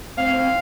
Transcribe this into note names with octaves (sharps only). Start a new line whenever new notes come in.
C4 F5
C4